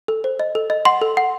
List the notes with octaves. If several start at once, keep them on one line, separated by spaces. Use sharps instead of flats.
A4
C5
D#5
A4
D#5
F#5 C6
A4
F#5